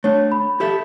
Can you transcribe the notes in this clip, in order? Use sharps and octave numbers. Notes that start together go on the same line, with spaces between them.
A3 D4 C#5
B5
G4 A4 E5